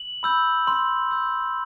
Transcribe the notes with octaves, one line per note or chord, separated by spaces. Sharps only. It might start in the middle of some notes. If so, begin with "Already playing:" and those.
Already playing: F#7
B5 E6 G6
C6
E6 G6